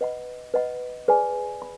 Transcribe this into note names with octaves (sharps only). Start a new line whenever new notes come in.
B4 D#5 F#5 B5
B4 D#5 F#5 B5
G#4 B4 D5 G#5 B5
B5